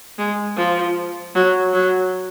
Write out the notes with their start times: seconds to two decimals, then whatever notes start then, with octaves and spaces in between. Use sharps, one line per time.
0.18 G#3
0.57 F3
1.35 F#3
1.73 F#3